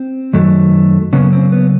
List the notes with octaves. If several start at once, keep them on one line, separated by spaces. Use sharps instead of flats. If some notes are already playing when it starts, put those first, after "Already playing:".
Already playing: C4
F#2 D#3 F#3 A3
C#3 F#3 A#3 B3 C#4
C4
B3